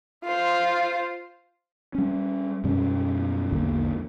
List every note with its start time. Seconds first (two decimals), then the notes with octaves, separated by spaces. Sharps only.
0.24 F4 C5
1.95 G3 C#4
2.64 F#2 B2 G3 C#4
3.52 A#1 E2 D3 A#3